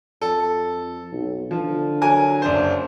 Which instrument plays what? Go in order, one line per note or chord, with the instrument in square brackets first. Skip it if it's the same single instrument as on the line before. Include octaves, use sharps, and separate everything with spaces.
[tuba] F2 [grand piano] A4
[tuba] B1
[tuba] D3 [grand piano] F3
[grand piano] F#3 A#4 G#5
F#1 D4 C5